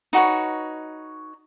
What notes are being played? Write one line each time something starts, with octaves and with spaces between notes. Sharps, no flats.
D#4 F#4 B4 C#5